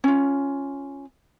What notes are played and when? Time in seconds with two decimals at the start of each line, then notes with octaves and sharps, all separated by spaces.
0.04 C#4 F4